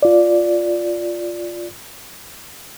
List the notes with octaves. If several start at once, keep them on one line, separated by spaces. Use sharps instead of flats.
F4 D5